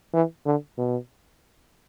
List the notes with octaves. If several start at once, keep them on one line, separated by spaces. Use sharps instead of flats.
E3
D3
B2